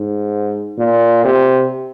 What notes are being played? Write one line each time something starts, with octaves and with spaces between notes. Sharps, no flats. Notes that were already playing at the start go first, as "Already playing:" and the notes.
Already playing: G#2
A#2
C3